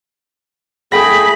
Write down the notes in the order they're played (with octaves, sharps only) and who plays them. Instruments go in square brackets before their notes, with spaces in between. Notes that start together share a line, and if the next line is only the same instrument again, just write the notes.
[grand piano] A3 G5 A#6 [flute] G#4 [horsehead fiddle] B5